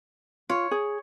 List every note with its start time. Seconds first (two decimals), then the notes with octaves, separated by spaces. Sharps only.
0.50 F4 C#5
0.71 G#4